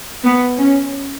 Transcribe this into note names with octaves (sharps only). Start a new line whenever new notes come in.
B3
C#4